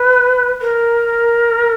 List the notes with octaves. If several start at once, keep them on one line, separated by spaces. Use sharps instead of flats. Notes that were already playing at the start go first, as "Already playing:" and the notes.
Already playing: B4
A#4